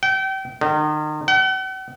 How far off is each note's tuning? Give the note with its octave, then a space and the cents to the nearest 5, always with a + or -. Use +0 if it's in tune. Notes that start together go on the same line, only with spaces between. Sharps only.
G5 -30
D#3 -35
F#5 +45